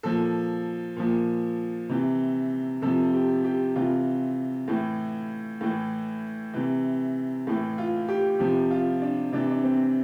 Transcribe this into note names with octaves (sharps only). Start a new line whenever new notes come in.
A#2 F3 A4
A#2 F3
C3 E3
C3 F3 A4
G4
G4
C3 E3 F4
A2 E3
A2 E3
C3 E3
A2 E3
F4
G4
C3 F3 G4
F4
D4
C3 E3 D4
D4
C4